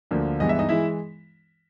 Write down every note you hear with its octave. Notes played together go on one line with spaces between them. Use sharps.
D2 D3 F3 A#3
G2 E3 G#3 B3 D#5
E5
D#4 D#5
E3 G#3 E4 E5